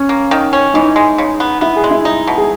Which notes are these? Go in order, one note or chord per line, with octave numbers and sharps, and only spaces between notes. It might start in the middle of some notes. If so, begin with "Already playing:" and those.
Already playing: C#4
A#3
D#3
C#4
E3 D#4
G#3
C#3
B3
B3 E4
G#4
G#3
E4
D#4
B2
G#4